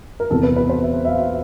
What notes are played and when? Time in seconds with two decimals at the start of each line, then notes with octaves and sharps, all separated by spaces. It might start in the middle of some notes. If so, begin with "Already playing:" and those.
0.20 A#4
0.30 E2 C3 E3 A4
0.43 B4
0.56 B4
0.69 C5
0.83 E5
1.05 E5
1.08 F5